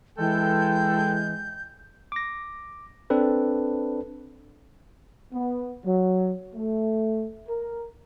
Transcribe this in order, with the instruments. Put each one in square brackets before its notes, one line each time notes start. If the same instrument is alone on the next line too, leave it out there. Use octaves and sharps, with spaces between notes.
[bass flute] E3 [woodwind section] G#3 [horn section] A4 G5 [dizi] G6
[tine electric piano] D6 A#6
C4 D4 A4 B4
[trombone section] B3
F#3
A3
A#4